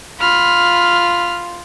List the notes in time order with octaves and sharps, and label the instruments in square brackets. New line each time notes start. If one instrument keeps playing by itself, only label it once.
[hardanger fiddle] F4 [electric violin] B5 F6